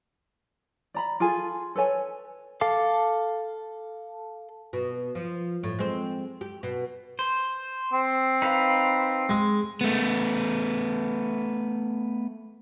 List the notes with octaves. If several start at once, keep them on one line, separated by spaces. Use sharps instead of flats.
D5 A#5 B5
F4 G#4 A4 G#5
A4 B4 C#5 G#5
A4 F5 D6
B2
F3
A2
G#3 C4
G4
B2
C5
C4
D#4 B4 F5
G#3
A3 B3